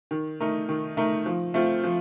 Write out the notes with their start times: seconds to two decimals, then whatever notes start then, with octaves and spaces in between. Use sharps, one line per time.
0.11 D#3
0.40 A3 D#4 A#4
0.69 D#3
0.97 A3 D#4 A#4
1.26 F3
1.54 A3 C4 F4
1.84 F3